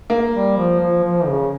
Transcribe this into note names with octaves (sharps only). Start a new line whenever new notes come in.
A#3
G3
F3
F3
F3
C#3